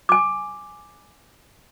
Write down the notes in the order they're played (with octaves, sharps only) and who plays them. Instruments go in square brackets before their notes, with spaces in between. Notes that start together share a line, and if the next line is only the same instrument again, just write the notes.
[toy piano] G#5 D6